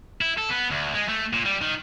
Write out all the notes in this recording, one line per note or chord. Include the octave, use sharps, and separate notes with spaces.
E4
A4
B3
D2
G#3
A3
A#2
G3
D#3